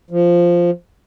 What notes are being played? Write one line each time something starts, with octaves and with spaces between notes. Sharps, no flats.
F3